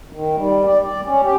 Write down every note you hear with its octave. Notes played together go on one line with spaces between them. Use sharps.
D#3
G3
D5
D5
C#4
G4